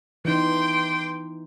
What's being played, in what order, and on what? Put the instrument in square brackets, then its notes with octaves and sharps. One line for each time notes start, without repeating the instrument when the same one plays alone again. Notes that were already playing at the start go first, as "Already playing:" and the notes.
[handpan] E3 D#4 [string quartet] G5 C6 D6